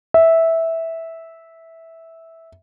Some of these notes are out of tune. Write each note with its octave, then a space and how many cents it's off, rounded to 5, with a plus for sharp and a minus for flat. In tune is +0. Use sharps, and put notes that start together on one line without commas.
E5 -10